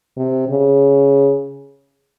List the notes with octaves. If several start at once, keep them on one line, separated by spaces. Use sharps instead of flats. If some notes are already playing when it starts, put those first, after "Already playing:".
C3
C#3